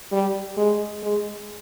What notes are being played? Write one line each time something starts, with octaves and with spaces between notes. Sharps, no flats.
G3
G#3
G#3